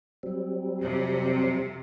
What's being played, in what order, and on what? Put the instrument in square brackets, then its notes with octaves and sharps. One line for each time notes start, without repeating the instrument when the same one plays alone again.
[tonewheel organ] F#3 G3 C4
[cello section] F2 C3